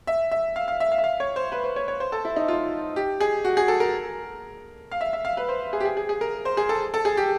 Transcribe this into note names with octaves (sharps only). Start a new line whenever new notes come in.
E5
E5
F5
F5
E5
F5
E5
F5
C#5
C5
B4
C5
C#5
C#5
C5
A4
E4
D#4
F4
G4
G#4
F#4
G#4
A4
A#4
F5
E5
E5
F5
B4
C5
G#4
G4
G#4
G#4
G#4
A#4
C5
G#4
A4
A4
G#4
G4